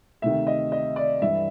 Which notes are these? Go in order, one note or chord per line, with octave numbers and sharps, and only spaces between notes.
D2 C3 D#3 E5
D#5
D#5
D5
G2 E3 E5